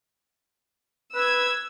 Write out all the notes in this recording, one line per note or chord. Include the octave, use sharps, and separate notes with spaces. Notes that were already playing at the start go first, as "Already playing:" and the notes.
B4 E6 G#6